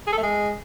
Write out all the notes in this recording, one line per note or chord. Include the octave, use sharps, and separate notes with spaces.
G#4
A4
A3
G#3